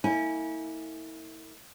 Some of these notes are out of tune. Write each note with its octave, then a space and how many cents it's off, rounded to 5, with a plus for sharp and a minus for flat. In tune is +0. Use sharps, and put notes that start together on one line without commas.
A#3 -45 E4 -35 G#5 +0